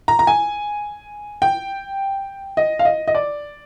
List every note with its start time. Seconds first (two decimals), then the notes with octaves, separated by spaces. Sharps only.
0.08 A#5
0.19 A#5
0.27 G#5
1.42 G5
2.57 D#5
2.79 F5
2.85 D#5
3.08 D#5
3.15 D5